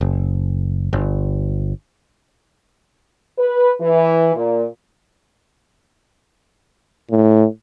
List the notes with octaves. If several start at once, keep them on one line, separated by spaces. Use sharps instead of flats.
F#1
G1
B4
E3
A#2
A2